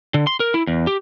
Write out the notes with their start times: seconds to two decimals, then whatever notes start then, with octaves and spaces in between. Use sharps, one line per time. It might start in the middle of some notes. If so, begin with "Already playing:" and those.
0.14 D3
0.27 C6
0.40 A#4
0.54 E4
0.67 E2
0.87 G4